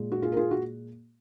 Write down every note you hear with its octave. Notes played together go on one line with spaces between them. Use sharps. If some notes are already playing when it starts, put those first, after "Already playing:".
Already playing: A#2 G#3
F#4
F4 G#4
A#4
F4 G#4
F#4